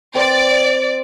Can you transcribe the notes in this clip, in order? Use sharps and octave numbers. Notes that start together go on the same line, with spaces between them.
C4 D5